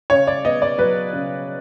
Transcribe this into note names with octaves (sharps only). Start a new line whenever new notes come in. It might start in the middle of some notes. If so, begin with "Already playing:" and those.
C#3 C#5
D5
B3 D#5
D5
F#3 B4
C#3